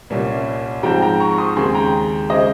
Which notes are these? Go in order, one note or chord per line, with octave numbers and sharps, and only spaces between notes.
C2 A#2 G3 C#4
G#2 F3 C4 G5 A#5
G5 A#5
A#5 C#6
C#6
C6 D#6
D#2 C#3 G#3 C4 G#5 C6
G5 A#5
C#3 G#3 C5 D#5